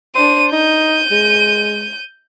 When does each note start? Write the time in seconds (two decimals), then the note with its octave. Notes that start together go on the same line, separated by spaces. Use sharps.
0.15 D4 C5 D#7
0.52 D#4 G6 D#7
1.11 G#3